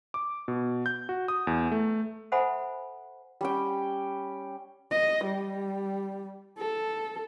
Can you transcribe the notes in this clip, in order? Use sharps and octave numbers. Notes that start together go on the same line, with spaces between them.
D6
B2
G6
F#4
D#6
E2
A3
A4 C5 E5 F#5 G#5 B5
G3 C#4 G5
D#5
G3
A4